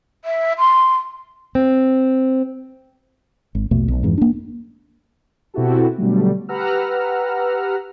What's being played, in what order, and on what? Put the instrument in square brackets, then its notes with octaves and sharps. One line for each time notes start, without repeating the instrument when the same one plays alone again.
[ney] E5
C6
[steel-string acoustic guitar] C4
[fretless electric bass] G#1
A#1 E2 B2 A3
B1
F2 G#2 E3
A#3 D4
[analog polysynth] B2 C4 E4 F#4 G4 A4
B2 D3 F#3 G3 A3
G4 B4 F#5 A#5 E6 F6